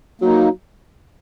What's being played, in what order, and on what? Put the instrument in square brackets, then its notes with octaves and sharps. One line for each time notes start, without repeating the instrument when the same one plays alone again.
[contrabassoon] F#3 [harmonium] A#3 D#4